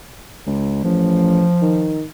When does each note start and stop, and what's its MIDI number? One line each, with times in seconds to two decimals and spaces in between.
0.46 0.80 37
0.84 1.47 33
0.84 2.01 53
1.62 2.04 51